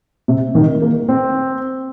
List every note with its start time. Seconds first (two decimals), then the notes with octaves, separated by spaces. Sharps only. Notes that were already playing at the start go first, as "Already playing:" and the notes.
0.28 C3
0.55 D#3
0.82 A#3
1.09 C4